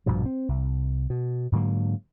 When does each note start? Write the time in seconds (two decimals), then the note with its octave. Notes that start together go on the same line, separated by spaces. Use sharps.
0.06 A#1 G2 B2 F3
0.26 C4
0.49 C2
1.10 B2
1.52 G#2 D3 F#3 A#3